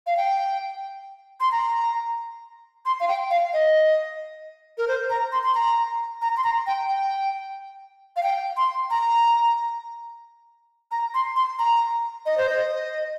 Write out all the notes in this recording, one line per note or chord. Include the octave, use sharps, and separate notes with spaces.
F5
G5
C6
A#5
C6
F5
G5
F5
D#5
A#4
C5
A#5
C6
C6
A#5
A#5
C6
A#5
G5
G5
F5
G5
C6
A#5
A#5
C6
C6
A#5
D#5
C5
D#5